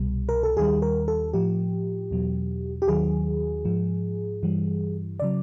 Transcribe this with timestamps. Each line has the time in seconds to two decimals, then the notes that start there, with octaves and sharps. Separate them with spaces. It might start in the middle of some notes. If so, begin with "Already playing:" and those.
Already playing: C2 B2 G3
0.29 A#4
0.43 A4
0.56 D#2 D#3 G3 G#4
0.82 A#4
1.08 A4
1.33 A2 F3 G4
2.11 E2 B2 F#3
2.82 G4
2.88 D#2 D#3 F#3 G#4
3.65 G#2 F3
4.43 G2 E3 G3
5.20 C#3 F#3 D5